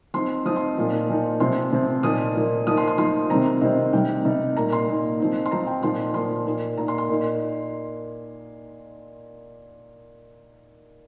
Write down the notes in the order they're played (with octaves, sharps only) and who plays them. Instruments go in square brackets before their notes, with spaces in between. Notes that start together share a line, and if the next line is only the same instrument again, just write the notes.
[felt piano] F3 C4 D#4 C6
F3 C4 D#4 D#6
C6
A#2 F3 D#4
A#2 F3 D#4
C3 F3 C4 C6
C3 F3 C4
A#2 F3 A#3 D#4 D#6
A#2 F3 A#3 D#4
F3 A#3 D#4 D#6
C6
C6
F3 A#3 D#4 C6
C3 D#3 G3 C4 A#5
C3 D#3 G3 C4 D#5
C3 G3 D#4 G5
C3 G3 D#4
A#2 A#3 D#4 A#5
C6
A#2 A#3 D#4
F3 C4 D#4
C6
F3 C4 D#4 A#5
G5
A#2 F3 D#4 C6
A#2 F3 D#4 C6
A#2 A#3 D#4
A#2 A#3 D#4 A#5
C6
C6
A#2 A#3 D#4